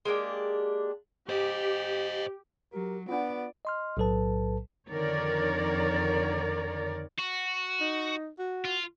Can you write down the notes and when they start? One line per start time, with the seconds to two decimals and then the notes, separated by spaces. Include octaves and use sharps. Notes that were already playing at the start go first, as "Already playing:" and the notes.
0.05 G#3 A#3 D4 G4
1.29 G4 C5 D#5
2.73 F#3 G4 A#4
3.09 B3 D4 F4 D5 F#5
3.65 D#5 C6 F6
3.97 B1 A2 F#3 A4 B4 A5
4.90 F2 D3 D#3 A#4 C#5 D5
7.18 F#4
7.81 D#4
8.39 F#4
8.65 F4